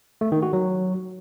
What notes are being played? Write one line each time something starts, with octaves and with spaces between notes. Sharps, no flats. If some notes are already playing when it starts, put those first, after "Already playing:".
A3
D#3
F#4
F#3